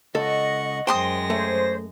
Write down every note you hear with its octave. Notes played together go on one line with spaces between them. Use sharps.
C#2 A4 D#5 F#5 C#6
F#2 G#3 C5 G5 C6 D#6 A#6
A3 C5 C#5